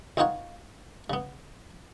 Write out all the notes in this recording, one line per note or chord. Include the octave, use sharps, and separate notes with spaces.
C#2 C4 D#4 F4 C#5 F#5
C#3 B3